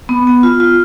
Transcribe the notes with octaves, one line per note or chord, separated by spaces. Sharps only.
B3
B3
F4
F4